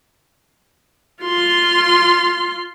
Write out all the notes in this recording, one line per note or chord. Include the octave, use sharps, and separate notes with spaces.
F4 C6